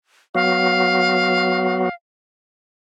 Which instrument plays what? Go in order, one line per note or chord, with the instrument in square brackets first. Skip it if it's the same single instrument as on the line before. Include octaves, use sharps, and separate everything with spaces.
[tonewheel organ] F#3 B3 F#4 [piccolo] F5